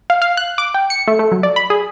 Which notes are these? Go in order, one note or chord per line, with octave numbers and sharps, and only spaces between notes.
F5
F5
F#6
D6
G5
C#7
A3
A3
F#3
D5
B5
G#4